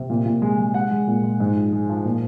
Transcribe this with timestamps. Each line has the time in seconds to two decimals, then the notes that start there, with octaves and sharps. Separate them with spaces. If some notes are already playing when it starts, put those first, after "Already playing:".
Already playing: C3
0.10 A#2
0.26 A#2
0.42 G#3
0.59 G#3
0.74 G#3 F#5
0.91 G#3
1.07 A#2
1.23 G#3
1.40 G#2
1.56 F3
1.73 G#3
1.89 F3
2.05 A#2